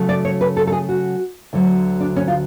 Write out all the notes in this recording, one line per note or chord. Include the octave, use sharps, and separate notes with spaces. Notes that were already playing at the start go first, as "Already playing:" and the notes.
Already playing: C#3 F#3 A3 C#4
D5
C#5
B4
A4
A4
G#4
F#4
D2 D3 F#3
D4
C#4
F4